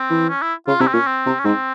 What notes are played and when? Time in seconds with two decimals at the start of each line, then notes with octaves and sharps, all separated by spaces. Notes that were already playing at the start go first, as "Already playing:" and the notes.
Already playing: C4
0.10 E3
0.29 C#4
0.42 E4
0.68 C#3 F4
0.80 C3 E4
0.87 C4
0.93 A#2 C#4
1.07 C4
1.26 C3
1.39 C#4
1.45 G#2 C4